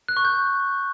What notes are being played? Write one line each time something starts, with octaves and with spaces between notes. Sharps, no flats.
F#6
C#6
G6